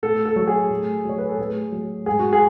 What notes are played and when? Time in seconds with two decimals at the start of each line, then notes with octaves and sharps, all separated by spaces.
0.03 A2 A4
0.25 A4
0.36 F#3
0.47 G#4
0.70 A2
1.05 F#3 C#5
1.18 B4
1.29 A4
1.38 A2 G#4
1.72 F#3
2.06 G#2 G#4
2.19 F#4
2.33 G#4